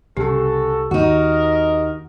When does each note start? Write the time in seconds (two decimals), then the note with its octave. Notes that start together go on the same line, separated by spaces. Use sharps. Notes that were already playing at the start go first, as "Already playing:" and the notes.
0.17 C2 C#3 F#4 G4 A4
0.91 D#2 D#4 F#4 A#4 D#5